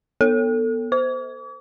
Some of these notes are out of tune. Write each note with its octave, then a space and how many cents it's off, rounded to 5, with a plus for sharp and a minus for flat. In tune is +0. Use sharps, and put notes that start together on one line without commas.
B3 -15 A4 +25
C5 -20 D6 -45